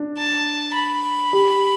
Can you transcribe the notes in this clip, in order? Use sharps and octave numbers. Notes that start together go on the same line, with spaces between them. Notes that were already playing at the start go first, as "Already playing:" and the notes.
Already playing: D4
A5
B5
G4